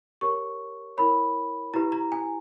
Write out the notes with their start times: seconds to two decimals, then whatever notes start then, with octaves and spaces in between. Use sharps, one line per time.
0.21 G4 A#4 C#5 C#6
0.97 E4 A#4 C#5 B5
1.74 E4 G4 B4 A#5
1.92 A#5
2.12 G#5